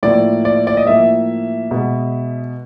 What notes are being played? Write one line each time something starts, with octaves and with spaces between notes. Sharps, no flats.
A2 F3 A#3 D5
D5
D5
D#5
A2 F3 A#3 E5
B2 G#3